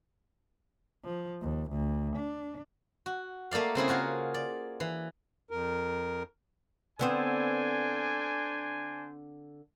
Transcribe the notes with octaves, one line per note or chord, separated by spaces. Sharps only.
F3
D#2
D2
D4
F#4
A3 A#3 A4 D5 F5
C#3 C4 E4 G#4
F4 F#4 A#4 C#5
D5
E3
F2 A#4
D3 B3 C4 D4 C5 G#5